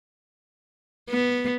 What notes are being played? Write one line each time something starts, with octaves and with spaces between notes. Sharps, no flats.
B3